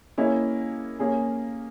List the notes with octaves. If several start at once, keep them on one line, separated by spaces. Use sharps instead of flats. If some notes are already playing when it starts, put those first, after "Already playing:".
A#3 C#4 E4 G#4 D#5
A#3 C#4 G#4